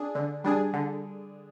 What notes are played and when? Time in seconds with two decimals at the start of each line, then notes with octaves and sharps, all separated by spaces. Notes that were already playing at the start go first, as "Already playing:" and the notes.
Already playing: D4 G#4
0.15 D3
0.44 G3 D4 G#4
0.73 D3